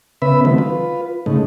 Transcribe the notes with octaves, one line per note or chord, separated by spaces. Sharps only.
C#3 B3 B4 E5 B5
D#3 F#3 A3 C4
F4 B4
G#2 C#3 A3 D#4